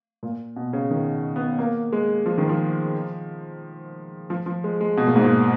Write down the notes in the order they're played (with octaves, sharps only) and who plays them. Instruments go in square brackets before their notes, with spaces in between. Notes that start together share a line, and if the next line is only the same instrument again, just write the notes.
[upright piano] A#2
B2
C#3
D#3
B3
A#3
G#3
F3
D#3
F3
F3
F3
G#3
G#3
B2
A#2
G#2
A#2